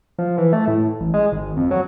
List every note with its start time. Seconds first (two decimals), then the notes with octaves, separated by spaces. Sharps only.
0.18 F3
0.38 E3
0.53 A3
0.68 A2
1.01 A1
1.14 G#3
1.32 G#1
1.57 F2
1.71 F#3